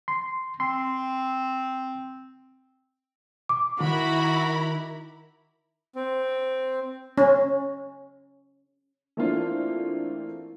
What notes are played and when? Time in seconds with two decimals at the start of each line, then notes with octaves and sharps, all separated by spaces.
0.08 C6
0.60 C4 C6
3.49 D6
3.80 D#3 E4 F#4 A#5 B5
5.96 C4
7.18 C#4
9.17 E3 A3 A#3 C4 D4 F4